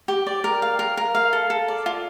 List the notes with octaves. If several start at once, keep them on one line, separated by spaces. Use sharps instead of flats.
G4
D5
A#4
F5
A#4
A#4
F5
A4
A4
D5
F4